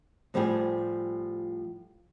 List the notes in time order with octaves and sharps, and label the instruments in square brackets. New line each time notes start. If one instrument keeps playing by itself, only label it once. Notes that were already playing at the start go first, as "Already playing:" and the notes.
[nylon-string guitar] A2 F3 G3 G4 G#4